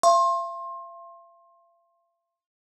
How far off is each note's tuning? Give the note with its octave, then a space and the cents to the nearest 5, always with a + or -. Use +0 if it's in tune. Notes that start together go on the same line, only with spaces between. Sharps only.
F5 -45 C6 +30